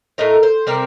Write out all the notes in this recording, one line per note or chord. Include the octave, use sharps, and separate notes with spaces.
A2 A3 D#4 A#4
C5
C3 G3 C4 A#4